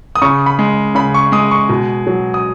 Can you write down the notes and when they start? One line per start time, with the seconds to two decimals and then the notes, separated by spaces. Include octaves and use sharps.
0.15 D#6
0.22 C#3 C#6
0.46 B5
0.59 G#3
0.95 C#3 B5
1.14 C#6
1.32 G#3 D#6
1.51 C#6
1.69 B2
2.07 F#3
2.34 D#6